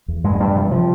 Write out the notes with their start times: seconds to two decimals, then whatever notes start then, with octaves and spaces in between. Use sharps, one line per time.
0.08 E2
0.24 G2 G#3
0.35 G#3
0.40 G2 G3
0.56 C3 F3
0.64 G3
0.71 C3 F3